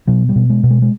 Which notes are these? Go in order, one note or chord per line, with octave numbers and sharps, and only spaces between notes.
B2 F#3
G3
B2
G#3
B2
G#3
G#3